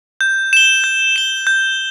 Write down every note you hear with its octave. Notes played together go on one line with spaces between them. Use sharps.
G6
E7 G7
G6
E7 G7
G6